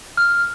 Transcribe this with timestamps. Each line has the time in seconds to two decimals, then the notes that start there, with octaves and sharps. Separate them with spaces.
0.17 F6